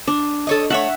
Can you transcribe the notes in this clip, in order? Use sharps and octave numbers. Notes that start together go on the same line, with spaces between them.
D4
A4 C#5 D#5
A3 C#5 E5 F#5